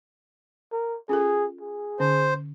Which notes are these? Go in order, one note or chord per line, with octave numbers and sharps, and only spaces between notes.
A#4
C#4 F4 G#4 A4
G#4
D3 C#4 C5